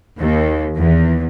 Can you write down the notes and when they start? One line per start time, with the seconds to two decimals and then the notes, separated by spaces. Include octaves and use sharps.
0.19 D#2
0.76 E2